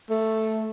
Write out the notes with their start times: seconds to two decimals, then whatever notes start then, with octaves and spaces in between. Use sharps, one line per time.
0.10 A3